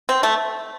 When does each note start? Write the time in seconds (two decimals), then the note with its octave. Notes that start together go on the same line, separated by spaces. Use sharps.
0.09 C4
0.23 A3